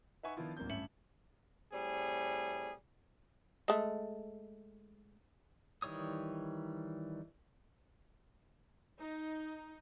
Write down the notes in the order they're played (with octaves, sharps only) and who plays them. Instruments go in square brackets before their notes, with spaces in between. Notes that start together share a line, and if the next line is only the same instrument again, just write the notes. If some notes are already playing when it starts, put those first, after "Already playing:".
[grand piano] D#4 B4 E5 F#5 G#5 C#6
D#3 F3 B3 D4 E4 F4
D1 A#3 C4 D4 G6
A1 G2 C#4 E5 C#7 F#7
[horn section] A2 G3 C4 G#4
[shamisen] G#3 A3
[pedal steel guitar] D#3 E3 G3 C#5 D#6
[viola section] D#4